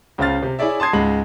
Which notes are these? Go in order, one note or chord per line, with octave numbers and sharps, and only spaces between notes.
C#2 C#3 C5 F5 F6 A6
C3
E4 G#4 C#5 D5 E5
A5 C6 D#6 G#6 C7
C#2 G#2 G#3 B5 F#7